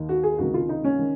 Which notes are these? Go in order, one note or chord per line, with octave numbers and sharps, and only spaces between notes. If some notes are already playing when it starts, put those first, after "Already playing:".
Already playing: D#2 D#3
F#4
G#4
C#2 C3 D#3 F#4
F4
D#4
C#4
D#3